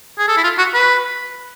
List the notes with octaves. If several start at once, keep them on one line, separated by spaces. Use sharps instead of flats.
G#4
A4
E4
F4
F#4
B4